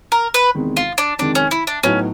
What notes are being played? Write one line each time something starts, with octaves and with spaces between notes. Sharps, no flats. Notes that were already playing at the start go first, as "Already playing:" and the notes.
A#4
B4
E2 C3 D#3 G#3
F4
D4
F2 C3 D#3 G#3 D4
C#4
E4
D4
A2 F#3 B3 C#4 D#4 F#4